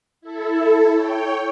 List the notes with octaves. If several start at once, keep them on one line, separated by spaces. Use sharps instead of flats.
E4 A4
C#5 G5